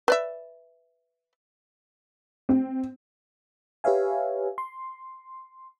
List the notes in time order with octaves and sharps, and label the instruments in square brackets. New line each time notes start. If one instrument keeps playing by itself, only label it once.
[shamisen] B4 D5 E5
[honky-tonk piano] C4
[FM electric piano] G4 B4 C#5 E5 F5 G#5
C6